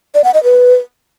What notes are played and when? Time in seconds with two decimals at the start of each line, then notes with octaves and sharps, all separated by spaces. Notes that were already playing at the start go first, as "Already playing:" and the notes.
0.15 D5
0.24 F#5
0.34 D#5
0.44 B4